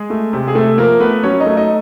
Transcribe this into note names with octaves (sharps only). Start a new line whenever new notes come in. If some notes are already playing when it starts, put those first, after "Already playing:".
Already playing: G#3 G#4
A3
C3
G#4
C3 A3 A4
F3 A#3 A#4
A3 B3 B4
F#3 C#4 C#5
D#4 D#5
A3
D#4 D#5